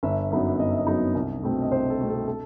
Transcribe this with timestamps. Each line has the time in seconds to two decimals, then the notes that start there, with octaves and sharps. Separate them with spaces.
0.03 G1 E5
0.31 F#2 F#3 B3 D#4 E5
0.59 G1 D#5
0.69 E5
0.78 D#5
0.87 F#2 F#3 B3 D#4
1.15 C2
1.43 B2 A3 C4
1.62 D#5
1.72 C2 C5
1.90 A4
1.99 B2 A3 C4
2.09 A4
2.27 A4